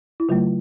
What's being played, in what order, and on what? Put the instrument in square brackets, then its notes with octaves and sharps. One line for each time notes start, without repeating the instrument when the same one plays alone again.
[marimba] E4
C#3 F#3 A3 F4